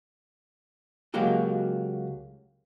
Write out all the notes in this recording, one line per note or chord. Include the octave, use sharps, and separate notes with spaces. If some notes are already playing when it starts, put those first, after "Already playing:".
C#2 F#3 G#3 A#3 F#4 G4